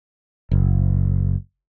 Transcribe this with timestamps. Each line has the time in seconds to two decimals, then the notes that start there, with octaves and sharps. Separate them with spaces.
0.51 F#1